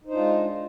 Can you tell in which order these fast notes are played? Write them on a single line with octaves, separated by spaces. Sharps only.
D#4 C5 D4 F4 G#3